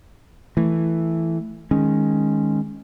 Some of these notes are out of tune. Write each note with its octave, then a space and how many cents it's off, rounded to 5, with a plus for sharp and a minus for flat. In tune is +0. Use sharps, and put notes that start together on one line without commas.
E3 +0 A3 +0
D#3 +0 G#3 +0 C#4 +0